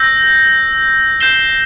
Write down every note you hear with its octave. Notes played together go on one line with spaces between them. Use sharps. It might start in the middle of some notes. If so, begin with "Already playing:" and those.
Already playing: E6 G6 A#6
G6 C7 E7 G7